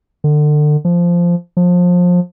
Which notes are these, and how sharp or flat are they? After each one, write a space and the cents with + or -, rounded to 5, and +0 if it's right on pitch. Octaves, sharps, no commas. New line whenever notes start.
D3 +30
F3 -10
F3 +25